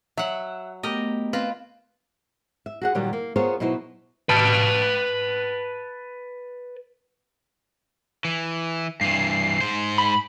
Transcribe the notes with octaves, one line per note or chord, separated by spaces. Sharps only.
F#3 E5 F#5
A3 B3 G4 A#4 D#5
C4 F4 B4
E5
F#4 G#4 F#5
A#2 D#3 F#3 G3 G4
A#3
B3 F4 G#4 A#4 C5 C#5
B2 F#3 D#4 E4 B4 C5
B4 A5
E3
G2 E3 C7
G#2 C5
B5